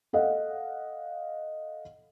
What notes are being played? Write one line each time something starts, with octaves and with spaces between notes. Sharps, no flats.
A4 D#5 F5 F#5